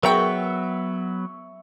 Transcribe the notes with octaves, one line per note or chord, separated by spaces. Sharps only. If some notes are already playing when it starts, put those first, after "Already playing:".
F#3 B3 A#4 E5 G5 C#6